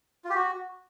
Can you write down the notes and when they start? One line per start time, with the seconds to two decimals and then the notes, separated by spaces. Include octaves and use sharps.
0.24 F4
0.30 G4
0.35 F#4